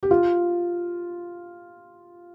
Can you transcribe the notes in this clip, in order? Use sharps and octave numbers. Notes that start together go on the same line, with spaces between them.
G4
F4